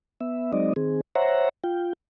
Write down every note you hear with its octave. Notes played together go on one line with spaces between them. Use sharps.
B3 E5
F#3 G#3 C4 D#4 D5 D#5
D#3 C4 G#4
C5 C#5 E5 F#5 A#5
F4 G5